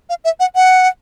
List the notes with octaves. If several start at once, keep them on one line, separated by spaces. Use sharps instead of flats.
F5
E5
F#5
F#5